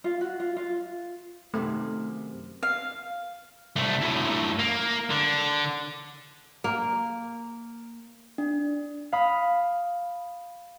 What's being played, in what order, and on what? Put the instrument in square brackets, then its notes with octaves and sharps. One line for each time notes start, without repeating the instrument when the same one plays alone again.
[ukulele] F4
F#4
F4
F4
[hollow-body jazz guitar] F#2 C3 D#3 [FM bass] A3
[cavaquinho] F5
[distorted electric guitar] C2 A3
F#2 A2
A#3
D3
[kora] A#3
[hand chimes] D4
[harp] F5 B5 D#6 F6